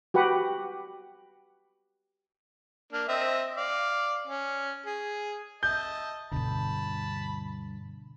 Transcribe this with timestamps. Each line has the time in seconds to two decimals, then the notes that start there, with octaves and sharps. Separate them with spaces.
0.14 F#4 G4 B4 F#5
2.92 A#3 D4
3.08 C4 D#5 E5
3.56 D5 F5
4.28 C#4
4.86 G#4
5.63 D#5 E5 A5 G6
6.32 D2 G2 B2 D3 A5 B5